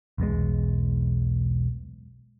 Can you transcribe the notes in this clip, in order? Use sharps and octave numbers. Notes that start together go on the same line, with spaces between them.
B1 E2 B2 G#3